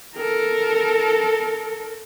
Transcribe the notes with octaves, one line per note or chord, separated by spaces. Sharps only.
A4 A#4